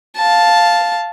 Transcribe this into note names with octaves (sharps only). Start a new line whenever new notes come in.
F5 A5